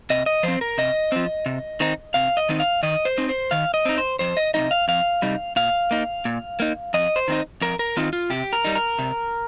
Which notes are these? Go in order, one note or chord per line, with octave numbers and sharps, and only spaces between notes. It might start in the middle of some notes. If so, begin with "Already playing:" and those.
C3 D#5
D#5
F3 C4 C5
A#4
C3 D#5
F3 C4
C3
D#3 C4 D#4
C3 F5
D#5
D#3 C4 D#4
F5
D#3 D#5
C5
C4 D#4
C5
D#3 F5
D#5
C4 D#4
C5
F2 C5
D#5
C3 G3 D#4 D#5
F5
F2 F5
C3 G3 D#4
A#2 F5
A#3 D#4
A#2
A#3 D#4
F2 D#5
C5
D#3 C4 D#4
F2 A#4
A#4
D#3 C4 D#4 F4
F4
C3 G4
A#4
G3 D#4
A#4
C3